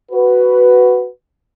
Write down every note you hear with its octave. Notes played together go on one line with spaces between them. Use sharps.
F#4 B4